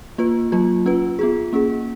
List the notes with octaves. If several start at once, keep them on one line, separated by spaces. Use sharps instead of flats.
A#3 F4 B4
F#3 A#3 F4
C#4 F4 B4
B3 F4 G#4
A#3 C#4 G#4